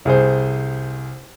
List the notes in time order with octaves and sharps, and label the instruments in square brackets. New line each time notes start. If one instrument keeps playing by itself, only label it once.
[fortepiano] C2 G#4 C5